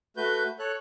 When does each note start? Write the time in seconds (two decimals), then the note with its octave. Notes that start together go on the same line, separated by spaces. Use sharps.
0.17 A3 F#4 B4 G6
0.59 A4 C#5 F#6